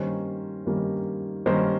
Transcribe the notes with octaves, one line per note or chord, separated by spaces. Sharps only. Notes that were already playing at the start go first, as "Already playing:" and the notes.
Already playing: G2 D#3 G3 A#3 C#4 A#4 C5
G2 D#3 G3 A#3 C#4
G2 D#3 G3 A#3 C#4 A#4 C5